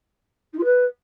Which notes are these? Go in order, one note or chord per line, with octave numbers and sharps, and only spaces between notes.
D#4
F4
B4